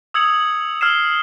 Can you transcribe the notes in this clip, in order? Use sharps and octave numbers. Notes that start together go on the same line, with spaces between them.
D#6 E6 G#6 C#7 F7 F#7
E6 F6 G#6 C7 E7